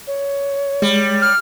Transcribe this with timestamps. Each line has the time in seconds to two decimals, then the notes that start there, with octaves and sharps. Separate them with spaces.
0.07 C#5
0.82 G3 G#3
1.22 F6